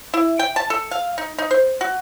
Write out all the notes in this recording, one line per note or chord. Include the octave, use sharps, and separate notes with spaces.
E4
G5
A5
A4
F5
D#4
D#4
C5
F#4